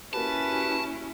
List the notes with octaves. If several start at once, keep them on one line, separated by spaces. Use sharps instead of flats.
A#3 C#4 E4 F#4 G4 B4 A5